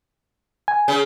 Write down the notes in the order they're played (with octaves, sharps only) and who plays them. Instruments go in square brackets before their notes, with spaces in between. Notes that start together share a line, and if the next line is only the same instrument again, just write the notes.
[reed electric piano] G#5
[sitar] C#3